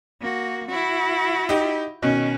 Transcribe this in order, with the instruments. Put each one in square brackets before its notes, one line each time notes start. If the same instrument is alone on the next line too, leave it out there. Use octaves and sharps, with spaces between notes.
[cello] A#3 F#4
E4 F#4
[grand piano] D#4 G4
[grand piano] B2 D#3 [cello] C#4